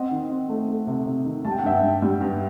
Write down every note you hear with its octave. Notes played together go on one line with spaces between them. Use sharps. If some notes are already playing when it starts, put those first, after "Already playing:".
Already playing: C4 D#5 F#5
D#3
C4
A3
A3
C3
C3
D#3
G3 A5
G5
F#5
G2 E5 G5
G2
G3
G2